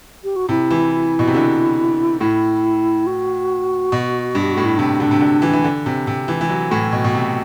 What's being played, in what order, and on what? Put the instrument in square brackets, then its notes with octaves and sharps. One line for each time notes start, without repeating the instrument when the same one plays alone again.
[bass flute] G4
F#4
[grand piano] C3 [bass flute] E4
[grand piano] E3
B2
C3
D3
[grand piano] A2 [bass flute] E4
[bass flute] F#4
[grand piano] B2
[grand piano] G2 [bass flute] G4
[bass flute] F#4
[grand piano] A2
[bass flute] E4
[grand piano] C3 [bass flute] D4
[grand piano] D3
C3
D3
E3
E3
D3
C3
C3
E3
E3
F#3
A2
B2
B2
C3